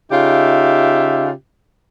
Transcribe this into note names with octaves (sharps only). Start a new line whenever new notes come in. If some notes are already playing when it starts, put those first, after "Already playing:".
C#3 D#4 F4 G4 E5